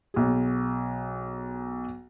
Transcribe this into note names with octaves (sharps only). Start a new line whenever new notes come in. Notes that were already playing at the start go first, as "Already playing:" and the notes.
B1 G#4